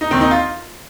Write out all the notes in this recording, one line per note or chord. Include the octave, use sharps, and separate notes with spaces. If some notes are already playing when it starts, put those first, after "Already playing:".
D#4
D#2 D#3 C4
D#4
F4